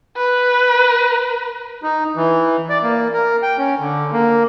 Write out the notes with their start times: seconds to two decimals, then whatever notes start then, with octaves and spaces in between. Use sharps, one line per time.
0.17 B4
1.83 D#4
2.16 E3
2.70 D5
2.83 A#3
3.13 A#4
3.42 G5
3.58 C#4
3.80 D3
4.12 A#3